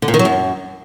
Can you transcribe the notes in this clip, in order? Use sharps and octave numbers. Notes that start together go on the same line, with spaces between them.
D3
A#2
D#3
F#3
F#2